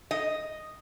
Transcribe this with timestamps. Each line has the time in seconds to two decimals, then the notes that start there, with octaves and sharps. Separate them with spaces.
0.11 D#5